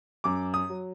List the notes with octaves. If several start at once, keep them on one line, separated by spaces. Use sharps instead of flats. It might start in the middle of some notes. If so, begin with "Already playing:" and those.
F#2 D6
D#6
F#3